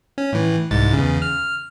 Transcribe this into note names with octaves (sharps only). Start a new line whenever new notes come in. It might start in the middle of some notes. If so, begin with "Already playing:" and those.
C#4
A2 E3
C2 G#2 A6
E2 C#3
F6